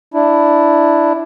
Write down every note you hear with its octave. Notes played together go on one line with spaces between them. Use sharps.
D4 E4